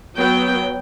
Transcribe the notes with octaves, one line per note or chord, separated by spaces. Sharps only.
F#3 B3 G5